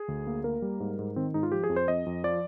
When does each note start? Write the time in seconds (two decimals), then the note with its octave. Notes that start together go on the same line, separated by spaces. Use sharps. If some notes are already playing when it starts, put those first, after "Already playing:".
Already playing: G#4
0.08 D2
0.27 A#3
0.44 A#3 A#4
0.62 G3
0.80 G#2
0.99 G#2
1.16 D#3 C4
1.34 G#2 D#4
1.43 F4
1.52 F3 G4
1.64 G#4
1.70 F2
1.76 C5
1.88 F2 D#5
2.06 F2
2.24 F3 D5